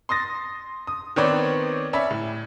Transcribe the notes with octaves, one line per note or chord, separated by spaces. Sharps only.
C6 D#6 A6 A#6
D#6
D#3 B3 C4 B4 C#5 D5
C#4 D5 E5 B5
A2